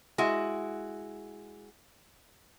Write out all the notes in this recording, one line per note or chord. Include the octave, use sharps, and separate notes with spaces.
G#3 E4 F#4